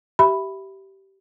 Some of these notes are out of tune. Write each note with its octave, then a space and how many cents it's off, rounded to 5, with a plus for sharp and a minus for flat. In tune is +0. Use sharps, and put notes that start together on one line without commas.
G4 -20 E5 +0 B5 +0